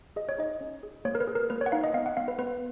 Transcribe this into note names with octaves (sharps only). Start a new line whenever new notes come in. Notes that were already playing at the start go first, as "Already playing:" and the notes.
G#4 D#5
C#5
D#4 D#5
C#4
G#4
A#3 C#5
A#4
B4
G#4
A#4
A#3 B4
C#5
F#5
D#4 F5
D#5
B3 F5
F#5
B3 F5
B4
B3 B4